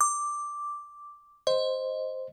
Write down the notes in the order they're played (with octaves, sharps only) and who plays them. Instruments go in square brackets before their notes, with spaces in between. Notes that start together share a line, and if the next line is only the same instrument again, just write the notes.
[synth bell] D6
[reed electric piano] C5 [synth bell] D#5